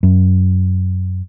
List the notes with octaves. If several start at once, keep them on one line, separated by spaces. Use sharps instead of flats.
F#2